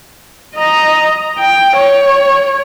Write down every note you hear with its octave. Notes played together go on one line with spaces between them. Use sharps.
D#5 A#5
G5
C#5